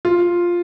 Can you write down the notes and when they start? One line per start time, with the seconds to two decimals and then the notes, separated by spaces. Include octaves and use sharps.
0.05 F4